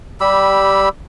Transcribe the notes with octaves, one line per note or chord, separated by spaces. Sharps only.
G3 G4 B5 E6